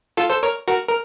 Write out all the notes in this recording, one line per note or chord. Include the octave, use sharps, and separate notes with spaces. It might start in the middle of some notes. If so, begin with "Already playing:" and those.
F4 A4
A4 C5
A#4 C#5
F#4 A#4
A#4